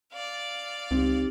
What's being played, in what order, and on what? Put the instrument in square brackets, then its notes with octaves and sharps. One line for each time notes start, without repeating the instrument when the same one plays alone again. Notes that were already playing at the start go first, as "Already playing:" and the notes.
[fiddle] D5 F5
[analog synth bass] C#2 [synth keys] C4 [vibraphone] D#4 G4